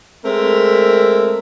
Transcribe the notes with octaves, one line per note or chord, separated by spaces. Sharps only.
G#3 A3 C4 A#4